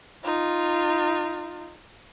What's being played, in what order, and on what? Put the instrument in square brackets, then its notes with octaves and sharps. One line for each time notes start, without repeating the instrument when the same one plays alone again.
[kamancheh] D#4 F4